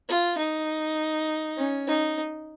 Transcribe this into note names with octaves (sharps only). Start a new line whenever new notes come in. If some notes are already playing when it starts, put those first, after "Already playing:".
F4
D#4
C#4
D#4